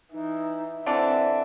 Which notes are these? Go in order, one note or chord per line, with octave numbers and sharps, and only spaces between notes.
E3 D#4
D3 E3 C4 D4 E5